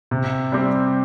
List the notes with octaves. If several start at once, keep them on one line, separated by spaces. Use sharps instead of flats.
C3
G3 C4 G4